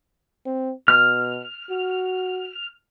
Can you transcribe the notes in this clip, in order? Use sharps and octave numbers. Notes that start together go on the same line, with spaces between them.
C4
B2 F6
F#4